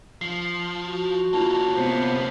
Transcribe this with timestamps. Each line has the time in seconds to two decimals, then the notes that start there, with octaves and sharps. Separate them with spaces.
0.21 F3 C7
0.86 F#4
1.33 A#3 C#4 E4 F4 A5
1.76 C3 B3 C5